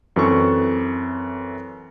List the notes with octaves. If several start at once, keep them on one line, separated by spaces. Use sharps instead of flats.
F#2 E3 C4 A4 C#6